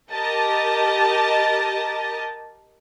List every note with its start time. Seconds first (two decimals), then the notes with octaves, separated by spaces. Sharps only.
0.12 G4 A#4 D#5 A5